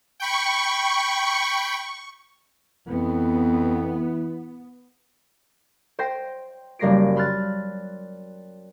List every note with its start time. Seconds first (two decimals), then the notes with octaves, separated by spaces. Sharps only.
0.20 G5 B5 C#6
2.88 F2 E3 B3
5.99 C5 G5 C6 G6 A#6 C7
6.79 F#1 G3 A#3 A#6 C7 D7
7.16 B5 C6 F6 F#6 A6